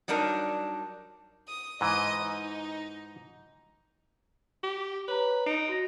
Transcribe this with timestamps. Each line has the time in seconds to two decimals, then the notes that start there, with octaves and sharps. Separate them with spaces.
0.08 F#3 G3 D4 D#4 A#4
1.48 D#6
1.81 G#2 E3 D#5 D#6
2.24 D#4
4.63 G4
5.08 B4 C#5 A#5
5.46 D#4 D7
5.69 F#4 A#6